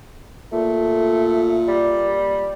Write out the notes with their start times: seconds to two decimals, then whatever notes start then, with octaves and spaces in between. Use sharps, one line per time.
0.52 A#2 A3
1.68 G3